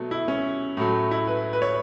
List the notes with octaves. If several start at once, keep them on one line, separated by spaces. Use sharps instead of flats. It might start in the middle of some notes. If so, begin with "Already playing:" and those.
Already playing: B2 F#3 A3
E4
C#4
A2 F#3 A3
E4
B4
B4
C#5